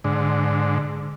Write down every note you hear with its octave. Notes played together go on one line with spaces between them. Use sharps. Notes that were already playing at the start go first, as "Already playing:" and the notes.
G#2 D3